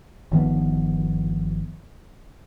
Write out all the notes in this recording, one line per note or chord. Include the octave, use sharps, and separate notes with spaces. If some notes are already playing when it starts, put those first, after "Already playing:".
G1 D#3 F3 B3